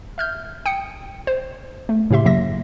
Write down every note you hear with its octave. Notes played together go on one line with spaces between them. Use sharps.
E5 F6 G6
G5 D#6 C#7
C5
A3
A2 C#3 G4 E5 C6
F#2 C#3 F#3 A#3 E5 A#6